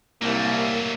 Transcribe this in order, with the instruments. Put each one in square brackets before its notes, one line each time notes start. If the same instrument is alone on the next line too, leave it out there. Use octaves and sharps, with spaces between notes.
[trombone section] C2 A#3 [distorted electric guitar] F#3 A3